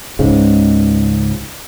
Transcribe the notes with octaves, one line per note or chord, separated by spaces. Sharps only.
C#2 G#2 C#3